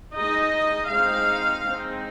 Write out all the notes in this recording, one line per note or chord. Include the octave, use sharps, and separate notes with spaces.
G#3 D#4 D#5
G#3 C4 D#4 F5
G#3 C4 D#4